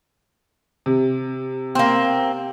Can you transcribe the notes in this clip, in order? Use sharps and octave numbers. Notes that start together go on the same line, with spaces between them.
C3
A#3 C4